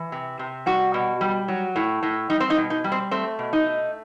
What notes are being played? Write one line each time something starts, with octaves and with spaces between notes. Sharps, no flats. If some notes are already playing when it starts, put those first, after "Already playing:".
Already playing: E3
C3
C3
G3 F#4
B2
G3
F#3
A2
A2
G3 D#4
C4
D#4
B2
D#4
G3
C4
A3 C4
B2
D#4
A3